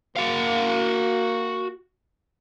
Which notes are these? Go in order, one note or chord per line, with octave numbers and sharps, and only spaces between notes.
A#3 F#4 F5